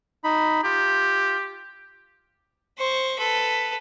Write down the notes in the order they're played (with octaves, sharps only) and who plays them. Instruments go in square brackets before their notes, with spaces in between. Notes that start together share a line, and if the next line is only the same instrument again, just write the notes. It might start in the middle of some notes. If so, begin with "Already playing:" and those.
[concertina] D#4 B5
[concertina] F4 [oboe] G4
[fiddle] C5 C#6
A4 B4